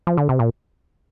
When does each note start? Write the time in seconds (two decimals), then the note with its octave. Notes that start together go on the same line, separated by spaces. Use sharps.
0.07 F3
0.17 D3
0.29 C3
0.39 A#2